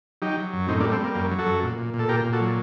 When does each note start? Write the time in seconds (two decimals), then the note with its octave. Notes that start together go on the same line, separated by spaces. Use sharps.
0.22 F#3 D#4 G4
0.37 F#3
0.53 F#2
0.68 A2 C4 D#4
0.80 A#3 D4
0.84 G3
0.92 A3 C4
1.00 G3 A#3
1.15 F#2 A#3
1.31 F#3
1.39 F#4 A4
1.46 F#2
1.63 A#2
1.78 A#2
1.94 A#2
1.99 A4
2.09 A#2 G4 A#4
2.25 A#2
2.33 F#4 A4
2.40 F#3